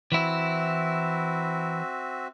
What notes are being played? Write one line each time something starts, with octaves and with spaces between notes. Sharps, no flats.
E3 C4 E4 F#4 E5